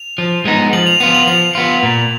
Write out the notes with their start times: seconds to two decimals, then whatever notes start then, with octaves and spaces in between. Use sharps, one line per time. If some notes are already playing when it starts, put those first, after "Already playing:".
Already playing: F7
0.18 F3
0.45 G#3 B3 D#4
0.73 F3 F#7
0.86 F7
1.00 B3 F4 F7
1.14 F#7
1.27 F3 F7
1.55 B3 F4
1.83 A#2